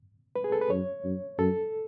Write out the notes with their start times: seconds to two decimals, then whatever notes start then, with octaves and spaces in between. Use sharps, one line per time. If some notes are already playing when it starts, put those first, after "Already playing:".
0.36 B4
0.44 G#4
0.52 A4
0.61 B4
0.70 F#2 C#5
1.04 F#2
1.39 F#2 A4